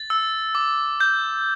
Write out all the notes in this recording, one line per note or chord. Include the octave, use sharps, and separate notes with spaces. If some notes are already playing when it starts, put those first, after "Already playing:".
Already playing: A6
E6
D6
G6